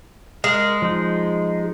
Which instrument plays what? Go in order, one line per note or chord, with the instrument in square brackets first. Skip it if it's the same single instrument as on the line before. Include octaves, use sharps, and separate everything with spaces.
[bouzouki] G#3 [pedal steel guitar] A#4
[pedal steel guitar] F3 D#4